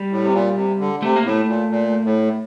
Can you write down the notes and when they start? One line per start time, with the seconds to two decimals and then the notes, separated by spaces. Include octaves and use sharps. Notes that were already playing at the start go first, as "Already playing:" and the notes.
Already playing: G3
0.12 A2
0.23 C3
0.33 A#2
0.57 C3
0.80 D3
1.03 C3 A3
1.16 A#3
1.25 A2 A3
1.48 A#2
1.71 A#2
2.05 A2